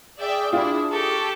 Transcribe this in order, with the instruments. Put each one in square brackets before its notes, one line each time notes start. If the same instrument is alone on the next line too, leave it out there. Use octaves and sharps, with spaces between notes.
[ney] G#4 [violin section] D5 E5 G5
[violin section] D4 E4 [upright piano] F4
[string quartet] G4 A4 [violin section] C#6